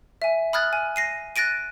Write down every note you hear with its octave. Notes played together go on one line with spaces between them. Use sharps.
E5 G#5
B5 D#6 F6 F#6 G#6 A6
G#5
A#6 C7 D#7
F#6 A6 A#6 D7 D#7